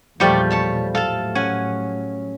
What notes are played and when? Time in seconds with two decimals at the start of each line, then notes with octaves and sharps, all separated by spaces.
0.20 E2 A#2 F3 G3 A3 C#5 D5 G5
0.50 C#5 A5 B5
0.95 A2 F#3 A4 F5 A5
1.35 C#4 F#5 G#5